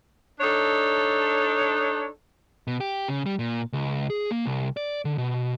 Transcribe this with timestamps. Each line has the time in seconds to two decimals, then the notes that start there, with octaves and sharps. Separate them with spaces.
0.41 D4 D#4 A4 C#5
2.67 B2
2.80 G4
3.08 C#3
3.26 G3
3.39 A#2
3.73 C#2
4.10 G#4
4.31 A#3
4.46 C2
4.77 D5
5.05 D3
5.18 B2